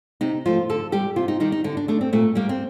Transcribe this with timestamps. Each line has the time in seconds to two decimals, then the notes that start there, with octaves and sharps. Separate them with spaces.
0.21 C3 D#4
0.45 F3 A3 F4
0.70 D3 A4
0.92 G3 G4
1.16 C3 F4
1.28 D#4
1.40 D#3 G3 D#4
1.52 D#4
1.64 D3 D4
1.77 D4
1.88 A3 D4
2.01 C4
2.13 A#2 A3
2.35 G3 A#3
2.49 C4